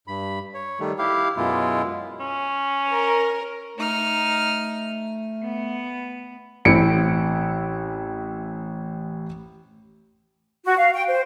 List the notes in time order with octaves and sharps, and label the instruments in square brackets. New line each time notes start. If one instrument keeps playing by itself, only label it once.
[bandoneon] G2 B5
C#5
D#3 G3 A3
E4 G4 F5
F#2 B2 G#3 E4 F4
[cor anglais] C#4
[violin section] A#4
[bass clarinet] A3 [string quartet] D#4 F6
[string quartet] B3
[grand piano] A1 C4 E4 C#7 D7
[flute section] F#4
F5
G5
C5